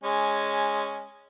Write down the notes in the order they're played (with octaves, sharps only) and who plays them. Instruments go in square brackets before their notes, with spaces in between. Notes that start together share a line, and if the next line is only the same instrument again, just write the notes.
[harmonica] G#3 C#4